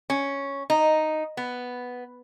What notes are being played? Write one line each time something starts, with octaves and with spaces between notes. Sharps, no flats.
C#4
D#4
B3